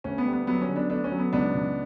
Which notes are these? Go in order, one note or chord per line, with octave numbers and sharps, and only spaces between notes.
D2 C#4
B3
G3
B3
F#3 B3
C#4
D3
B3 D4
A3 B3 D4
C#4
F#3
B3
C#2 B3 D4
C#2